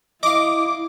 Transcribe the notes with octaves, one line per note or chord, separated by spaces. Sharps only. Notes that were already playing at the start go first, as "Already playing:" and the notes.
E4 D#5 F5 D6